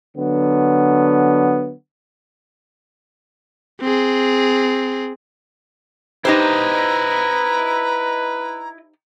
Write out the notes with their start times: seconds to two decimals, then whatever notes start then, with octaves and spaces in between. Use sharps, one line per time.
0.17 D3 F#3 B3
3.81 C4 G#4
6.25 D#4 E4 G4 B4 C5 D#5 A#5